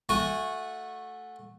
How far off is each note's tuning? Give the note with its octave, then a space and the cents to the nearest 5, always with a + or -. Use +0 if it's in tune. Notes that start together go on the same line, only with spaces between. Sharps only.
A3 +0 F#4 -20 G#5 -20